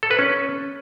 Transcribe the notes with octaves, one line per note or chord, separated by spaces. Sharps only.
A4
B4
C#4